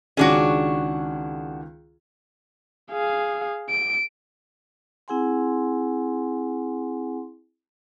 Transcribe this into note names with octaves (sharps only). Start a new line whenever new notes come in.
C#2 D#3 C#4 D4 F#4 G#4
G#4 F5
D7
C4 E4 G#4 F#5 G#5 C6